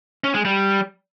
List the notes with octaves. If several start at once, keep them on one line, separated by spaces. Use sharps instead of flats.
C#4
G#3
G3